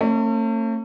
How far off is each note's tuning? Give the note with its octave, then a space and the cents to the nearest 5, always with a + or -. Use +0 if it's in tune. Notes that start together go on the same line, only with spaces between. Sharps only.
A3 +40 C#4 -35